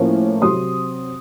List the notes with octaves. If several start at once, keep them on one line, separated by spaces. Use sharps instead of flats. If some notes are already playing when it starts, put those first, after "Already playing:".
Already playing: A2 F3 A#3 C#4
C3 F#3 C4 C6 D#6